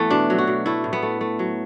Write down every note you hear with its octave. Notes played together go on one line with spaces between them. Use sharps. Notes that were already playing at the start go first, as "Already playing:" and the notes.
Already playing: E3 A3 B3
B2 D4
F#3
F#4
B2
A3 E4
A2
B3
A3
A3
F#3